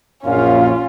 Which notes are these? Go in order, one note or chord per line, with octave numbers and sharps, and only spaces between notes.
A#1 F#2 A#2 C#4 F4 F5